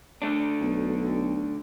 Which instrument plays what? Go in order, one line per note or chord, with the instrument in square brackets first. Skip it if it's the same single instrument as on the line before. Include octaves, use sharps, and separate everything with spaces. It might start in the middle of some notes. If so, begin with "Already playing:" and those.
[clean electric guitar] D3 A3 D4
[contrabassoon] B1